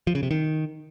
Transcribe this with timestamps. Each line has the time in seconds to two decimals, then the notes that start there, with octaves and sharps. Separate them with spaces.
0.07 F3
0.15 C#3
0.23 C3
0.31 D#3